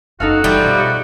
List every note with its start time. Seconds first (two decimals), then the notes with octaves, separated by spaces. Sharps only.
0.20 F#1 D#4 F#4 A4 F5
0.44 E3 F3 G3 A3
0.63 B2